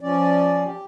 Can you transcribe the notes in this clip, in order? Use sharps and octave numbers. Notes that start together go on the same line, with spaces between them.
F3 C#4 D5
G4